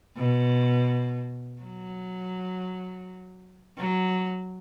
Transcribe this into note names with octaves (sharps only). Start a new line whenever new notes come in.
B2
F#3
F#3